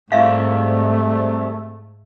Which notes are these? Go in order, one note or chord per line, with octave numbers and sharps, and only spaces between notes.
C2 G#2 A3 E5 F5